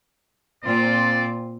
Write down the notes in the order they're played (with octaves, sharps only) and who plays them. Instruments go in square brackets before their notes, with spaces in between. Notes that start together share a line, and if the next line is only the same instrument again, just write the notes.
[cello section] A#2 C4 F4 [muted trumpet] D5